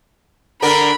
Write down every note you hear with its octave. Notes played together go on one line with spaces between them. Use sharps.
D3 D4 A#4 B5